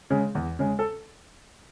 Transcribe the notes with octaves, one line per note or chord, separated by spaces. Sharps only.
C#3 G#3
E2
C#3 G#3
A4